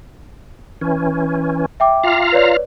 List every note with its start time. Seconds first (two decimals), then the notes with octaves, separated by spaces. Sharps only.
0.81 E3 C#4
1.80 E5 G5 D6
2.04 F4 F5 A#5
2.32 B4 C#5 D5